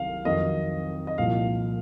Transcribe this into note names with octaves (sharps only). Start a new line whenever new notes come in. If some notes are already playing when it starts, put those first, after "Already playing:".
Already playing: C2 C3 D#3 F#3 F5
F2 D#3 F#3 D#5
D#5
C2 A#2 F3 F5